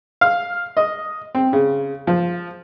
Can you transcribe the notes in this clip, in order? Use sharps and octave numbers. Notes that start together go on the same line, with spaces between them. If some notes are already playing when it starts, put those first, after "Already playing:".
F5
D#5
C4
C#3
F3